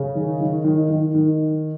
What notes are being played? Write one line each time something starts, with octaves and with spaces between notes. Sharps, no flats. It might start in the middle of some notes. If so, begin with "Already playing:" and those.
Already playing: C#3
D#3
D#3
D#3
D#3
D#3